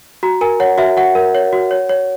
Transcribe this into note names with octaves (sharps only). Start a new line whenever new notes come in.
F#4 A#5
A#4 G#5
C#5 F#5
F#4 E5
F#4 F#5
A#4
C#5
F#4
C#5
C#5